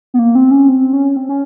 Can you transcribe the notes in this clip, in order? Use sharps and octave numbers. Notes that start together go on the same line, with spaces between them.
B3
A#3
C4
C#4
C4
C#4
C4
C#4